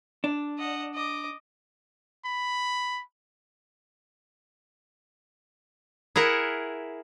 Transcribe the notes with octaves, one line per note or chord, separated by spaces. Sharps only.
D4
D#5 F#5
D#5 D6
B5
E4 G#4 A#4 F#5